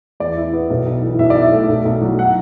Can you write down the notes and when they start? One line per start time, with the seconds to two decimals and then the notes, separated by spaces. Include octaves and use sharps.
0.20 E2 D5
0.36 E4
0.53 B3
0.70 B1
0.86 B1
1.03 E3
1.19 B1 E5
1.30 D5
1.36 E4
1.42 E5
1.52 A3
1.69 B1
1.85 B1
2.02 F#3
2.19 F#5